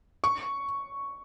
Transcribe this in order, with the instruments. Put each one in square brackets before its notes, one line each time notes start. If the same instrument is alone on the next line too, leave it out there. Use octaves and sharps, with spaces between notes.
[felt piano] C#6